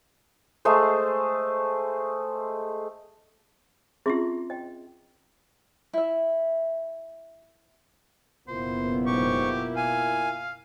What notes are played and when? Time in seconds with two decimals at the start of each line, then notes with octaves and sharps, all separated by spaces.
0.65 G#3 A3 G#4 C5
4.06 C4 C#4 F4 G#4 E5 C6
4.50 D#5 G5
5.93 E4 E5
8.48 F#1 B2 A#3 B3 E4 F4 C5
9.06 G#2 G4 C#6
9.76 F5 G#5